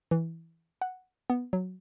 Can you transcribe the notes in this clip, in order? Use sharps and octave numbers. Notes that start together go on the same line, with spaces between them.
E3
F#5
B3
F#3